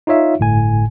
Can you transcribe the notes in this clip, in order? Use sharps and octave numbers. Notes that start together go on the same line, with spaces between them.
D#4 F4 C#5 E5 F5
G1 A2 G#5